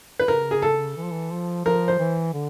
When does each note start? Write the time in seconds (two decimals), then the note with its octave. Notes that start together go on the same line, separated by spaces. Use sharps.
0.20 B4
0.28 C#3 A#4
0.51 G#4
0.62 A4
0.97 E3
1.04 F3
1.12 E3
1.32 F3
1.65 F3 A#4
1.88 C5
1.99 E3
2.34 D3